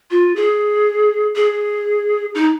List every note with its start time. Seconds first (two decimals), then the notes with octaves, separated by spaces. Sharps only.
0.11 F4
0.36 G#4
1.36 G#4
2.35 D#4